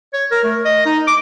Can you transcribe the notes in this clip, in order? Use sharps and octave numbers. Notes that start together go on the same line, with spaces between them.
C#5
A#4
A3
D#5
D#4
D6